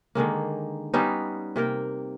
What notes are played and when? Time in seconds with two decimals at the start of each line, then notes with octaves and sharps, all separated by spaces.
0.15 D3 D#3 G#3 A#3
0.94 G3 B3 C#4 D#4
1.56 C3 A#3 A#4 G5